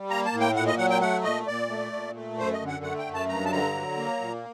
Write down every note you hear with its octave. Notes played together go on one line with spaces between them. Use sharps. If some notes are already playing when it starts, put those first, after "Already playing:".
Already playing: G3
A#3 A#5
A5
A2
G5
A#2 F#5
D#5
F#3 F#5
G5
A3 F#5
A#2 D#5
A#2 D5
A3
A#2
A3
F#2 C5
D#5
D3
F#5
A3 F#5
G5
F#2
A5
G2 A#5
A5
D3 A#5
F#3
A#3
A#2